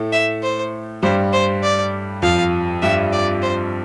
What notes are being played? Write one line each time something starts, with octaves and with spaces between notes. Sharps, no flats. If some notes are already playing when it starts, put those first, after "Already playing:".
Already playing: A2 A3
E5
C5
G2 G3 C5
C5
D5
F2 F3 F5
G2 G3 E5
D5
C5